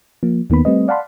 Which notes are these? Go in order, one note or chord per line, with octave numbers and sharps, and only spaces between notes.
F3 A#3
D#2 D#3 A#3 B3 B5
G3 A3 C4 B4 D#5
D5 F5 F#5 A5 B5 C6